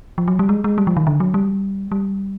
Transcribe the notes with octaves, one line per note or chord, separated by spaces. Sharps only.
F3
F#3
G3
G#3
G#3
G3
F3
D#3
D3
F#3
G3
G3